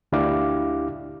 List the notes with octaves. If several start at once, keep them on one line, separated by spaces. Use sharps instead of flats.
D2 D4 E4 G4 F5 D6